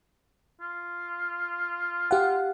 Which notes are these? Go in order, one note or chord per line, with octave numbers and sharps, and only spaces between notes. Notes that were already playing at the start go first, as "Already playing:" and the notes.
F4
G4 F5 F#5